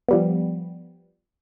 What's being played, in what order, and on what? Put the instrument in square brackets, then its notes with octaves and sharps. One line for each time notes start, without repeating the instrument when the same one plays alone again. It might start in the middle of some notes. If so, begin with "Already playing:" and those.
[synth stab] F3 G3 B3